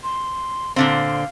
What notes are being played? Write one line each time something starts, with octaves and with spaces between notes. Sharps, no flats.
C6
A#2 D3 C4 F5